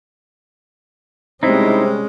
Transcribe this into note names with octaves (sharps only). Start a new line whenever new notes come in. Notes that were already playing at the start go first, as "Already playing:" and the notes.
C3 G3 G#3 C4 C#4 D#4 E4